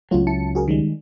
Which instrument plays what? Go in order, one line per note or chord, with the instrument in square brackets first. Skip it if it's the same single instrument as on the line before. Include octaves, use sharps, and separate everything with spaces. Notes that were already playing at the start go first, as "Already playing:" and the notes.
[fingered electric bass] C#2 F#3 [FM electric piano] A3 F4
[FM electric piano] E4 A5 C#7
F#4 G#4 A#4
D#3 G3 G#3